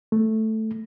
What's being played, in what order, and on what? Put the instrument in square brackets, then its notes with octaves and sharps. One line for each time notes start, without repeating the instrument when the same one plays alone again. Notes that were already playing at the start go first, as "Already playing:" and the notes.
[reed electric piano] A3